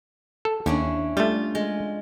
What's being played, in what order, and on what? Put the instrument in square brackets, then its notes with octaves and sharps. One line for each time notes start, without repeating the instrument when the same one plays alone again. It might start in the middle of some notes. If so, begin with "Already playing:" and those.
[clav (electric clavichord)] A4
[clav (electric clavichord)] D#2 [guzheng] C#4 D4 E4
[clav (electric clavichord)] G3 A3 [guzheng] F4
[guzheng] G#3